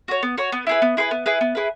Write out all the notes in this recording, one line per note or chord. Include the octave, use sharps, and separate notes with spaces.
F#4 C#5
B3
F#4 C#5
B3
E4 G#4 B4
B3
E4 G#4 B4
B3
E4 G#4 B4
B3
E4 G#4 B4